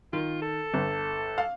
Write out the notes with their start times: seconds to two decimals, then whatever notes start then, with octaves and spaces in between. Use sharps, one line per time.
0.13 D#3 F4
0.42 A4
0.74 G1
1.38 F5